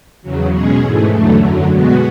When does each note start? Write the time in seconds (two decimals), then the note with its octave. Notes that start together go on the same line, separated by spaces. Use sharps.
0.22 E2 C#3 F#3
0.51 B2 G#3 C#4 G#4
0.81 G#2 E3 A3
1.11 E2 D3 F#3 A3
1.41 F#2 D3 F#3
1.70 B2 G#3 B3 F#4